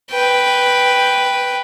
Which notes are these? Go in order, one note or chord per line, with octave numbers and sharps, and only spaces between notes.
B4 G5